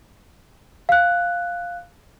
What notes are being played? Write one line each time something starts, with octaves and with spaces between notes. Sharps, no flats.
F5 F#6